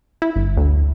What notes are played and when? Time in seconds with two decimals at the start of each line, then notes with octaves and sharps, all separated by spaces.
0.22 E4
0.36 G1
0.57 D2